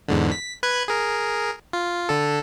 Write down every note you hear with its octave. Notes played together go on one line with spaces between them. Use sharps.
E2 G#2 D3
B6
B4 F#6 G#6
G#4 A#4
F4
D3 A4